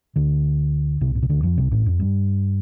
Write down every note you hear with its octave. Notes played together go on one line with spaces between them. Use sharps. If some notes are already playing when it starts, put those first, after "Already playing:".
D2 D3
C2 C3
A2
C3
D2 D3
F2 F3
C2 C3
A1 A2
F2
G2